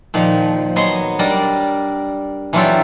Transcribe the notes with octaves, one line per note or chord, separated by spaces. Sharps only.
A#2 D#3 F3
F#3 B3 D#5 G#5 C6
G3 D4 A#4 D5 D#5
E3 F#3 D4 F4 G4 A4